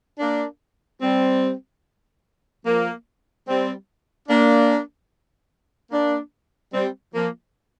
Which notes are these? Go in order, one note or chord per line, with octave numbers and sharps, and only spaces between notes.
A#3 D4
G3 C4
F3 A#3
G3 C4
A#3 D4
A#3 D4
G3 C4
F3 A#3